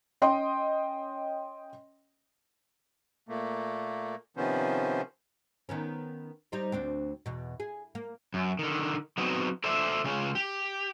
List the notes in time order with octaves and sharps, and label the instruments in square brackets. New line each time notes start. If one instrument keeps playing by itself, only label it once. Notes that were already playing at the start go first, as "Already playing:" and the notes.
[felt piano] C#4 D#5 G5 C6
[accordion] A#2 A3 A#3
C3 D#3 F3 B3 C#4 C5
[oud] D#3 B3 C#4
G3 D#4 C5
D2 C4 D4
E2 B2
G#4
A#3
[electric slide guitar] F#2
D3 D#3
F#3 B3 C4 D#4 F#4
A4 C5 D5 E5
C#3 G#3 C#4 F4
G4